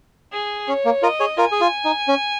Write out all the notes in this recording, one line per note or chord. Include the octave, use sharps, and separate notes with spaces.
G#4
C#4 C#5
A#3
F4 A#4 D#5
G#4 C#5
F4 A#4 G#5
G#4
F4
D#4
C#4